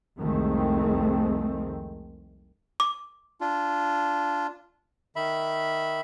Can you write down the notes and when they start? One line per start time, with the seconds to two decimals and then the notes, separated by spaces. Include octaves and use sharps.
0.19 C2 F2 D#3 G#3 A3 C4
2.80 D6
3.41 D4 F4
5.16 D#3 E5 B5